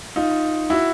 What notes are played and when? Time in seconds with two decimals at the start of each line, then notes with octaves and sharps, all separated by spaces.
0.16 D#4 F4
0.70 E4 F#4